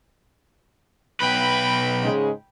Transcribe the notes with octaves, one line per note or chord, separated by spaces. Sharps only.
B1 B4 G5 B5
G#2 C#3 G#3